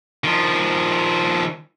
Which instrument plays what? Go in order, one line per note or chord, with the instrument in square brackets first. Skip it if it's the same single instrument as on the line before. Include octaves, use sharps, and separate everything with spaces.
[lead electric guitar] D#3 F3